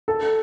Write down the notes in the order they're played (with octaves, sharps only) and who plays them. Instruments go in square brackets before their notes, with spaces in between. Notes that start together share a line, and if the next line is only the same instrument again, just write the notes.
[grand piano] A4